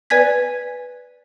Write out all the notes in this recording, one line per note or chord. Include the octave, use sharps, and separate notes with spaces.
B4 D5 G#5 G#6 B6